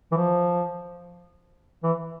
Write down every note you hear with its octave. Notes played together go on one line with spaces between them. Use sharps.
E3
F3
E3